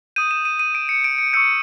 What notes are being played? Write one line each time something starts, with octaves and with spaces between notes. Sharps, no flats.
D#6 G6 D#7
E7
D#7
D#7
D7
C#7
D7
C#7
C#6 E6 G6 C#7